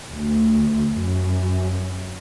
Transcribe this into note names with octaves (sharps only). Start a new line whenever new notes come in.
D2
F#2